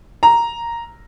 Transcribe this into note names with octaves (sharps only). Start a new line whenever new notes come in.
A#5